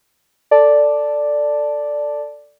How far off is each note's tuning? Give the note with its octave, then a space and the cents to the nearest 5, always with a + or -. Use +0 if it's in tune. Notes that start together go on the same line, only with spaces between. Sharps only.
A4 +15 D5 +0 A5 +0